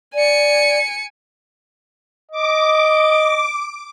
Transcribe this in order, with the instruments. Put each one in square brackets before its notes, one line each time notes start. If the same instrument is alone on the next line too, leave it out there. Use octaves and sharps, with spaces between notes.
[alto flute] D5 [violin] G#5 C#7
[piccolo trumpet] D#5 [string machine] D6